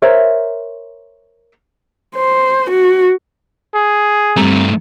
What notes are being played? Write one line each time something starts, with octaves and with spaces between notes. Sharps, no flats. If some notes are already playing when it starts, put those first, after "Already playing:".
A#4 C5 C#5 E5
C5
F#4
G#4
G2 G3 A3 C4 A#5